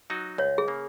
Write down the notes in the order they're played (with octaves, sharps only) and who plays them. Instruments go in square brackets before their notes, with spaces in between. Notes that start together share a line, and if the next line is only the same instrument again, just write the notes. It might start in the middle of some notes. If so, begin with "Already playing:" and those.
[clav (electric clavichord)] F#3 D#4 F#4
[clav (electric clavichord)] C#2 [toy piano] C#5
[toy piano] G#4
[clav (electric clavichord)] C#3 A#3